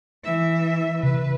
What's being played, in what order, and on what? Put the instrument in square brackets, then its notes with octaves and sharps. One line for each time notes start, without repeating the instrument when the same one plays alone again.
[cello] E3 E5
[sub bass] C3 [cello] B4